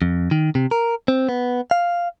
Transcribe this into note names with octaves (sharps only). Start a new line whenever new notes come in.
F2
D#3
C3
A#4
C4
B3
F5